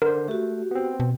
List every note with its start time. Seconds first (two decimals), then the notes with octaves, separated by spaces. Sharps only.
0.02 D3 A#4 C5
0.28 A3 F#4 G4
0.71 B3 C4
1.00 B2